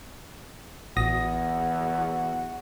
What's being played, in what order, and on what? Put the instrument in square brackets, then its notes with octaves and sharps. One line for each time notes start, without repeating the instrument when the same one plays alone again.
[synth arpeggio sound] A1 D#6 A#6 [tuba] E2 [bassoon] F#4